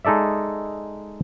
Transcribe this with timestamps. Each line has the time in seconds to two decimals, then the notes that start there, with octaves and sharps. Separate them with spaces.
0.05 G#3 D#4 A4 D5 E5